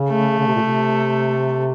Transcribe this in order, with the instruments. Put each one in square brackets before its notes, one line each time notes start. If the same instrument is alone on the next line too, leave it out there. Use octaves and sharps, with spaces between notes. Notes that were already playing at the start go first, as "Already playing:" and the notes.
Already playing: [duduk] C#3
[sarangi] A3
[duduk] C#3
C3
A#2
C3